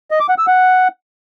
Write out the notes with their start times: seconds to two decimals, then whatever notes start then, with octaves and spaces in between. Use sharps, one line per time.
0.11 D#5
0.20 D6
0.29 F#5
0.38 E6
0.47 F#5